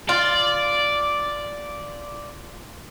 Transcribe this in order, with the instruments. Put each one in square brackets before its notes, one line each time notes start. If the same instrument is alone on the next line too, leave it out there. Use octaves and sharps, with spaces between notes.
[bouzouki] F4 [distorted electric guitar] D5